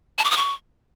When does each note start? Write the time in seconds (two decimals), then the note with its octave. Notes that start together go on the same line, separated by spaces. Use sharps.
0.18 A5
0.25 D6
0.31 D#6
0.37 C#6